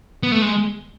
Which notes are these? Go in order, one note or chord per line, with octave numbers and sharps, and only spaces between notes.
B3
A3
G#3